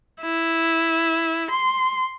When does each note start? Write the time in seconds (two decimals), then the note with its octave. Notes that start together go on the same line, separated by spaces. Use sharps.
0.21 E4
1.50 C6